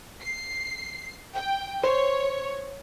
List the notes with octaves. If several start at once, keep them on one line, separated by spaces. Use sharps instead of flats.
C7
G5
C5 C#5